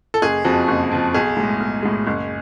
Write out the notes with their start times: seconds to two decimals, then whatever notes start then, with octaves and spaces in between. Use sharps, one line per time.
0.14 A4
0.22 F#1 G#4
0.44 F2 F3 F#4
0.68 F#1
0.91 F2 F3
1.14 B1 G#4
1.37 A2 G#3
1.60 B1
1.83 A2 G#3
2.07 F#1